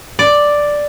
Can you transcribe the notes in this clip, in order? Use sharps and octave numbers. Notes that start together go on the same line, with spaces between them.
D5